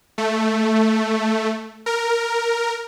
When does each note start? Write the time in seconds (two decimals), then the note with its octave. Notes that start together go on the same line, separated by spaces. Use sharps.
0.18 A3
1.86 A#4